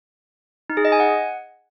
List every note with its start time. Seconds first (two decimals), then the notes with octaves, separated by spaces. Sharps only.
0.70 D#4
0.77 G#4
0.85 D#5
0.92 G#5
1.00 F#5